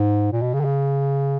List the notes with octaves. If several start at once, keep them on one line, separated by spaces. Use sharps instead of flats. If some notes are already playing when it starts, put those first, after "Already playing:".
Already playing: G#2
A#2
B2
C#3
D3
C#3